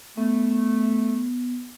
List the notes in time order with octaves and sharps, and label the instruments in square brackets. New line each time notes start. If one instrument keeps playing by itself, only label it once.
[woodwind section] A3 [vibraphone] B3